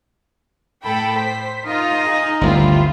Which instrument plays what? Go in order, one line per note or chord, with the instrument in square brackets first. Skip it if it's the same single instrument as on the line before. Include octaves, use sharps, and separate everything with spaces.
[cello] A2 [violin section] A4 G5 B5
[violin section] C5 B6
[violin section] D#4 F4 [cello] A#4 D#5
[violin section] D#4 G#4
[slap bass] G1 D2 G2 [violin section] C4 E4 F4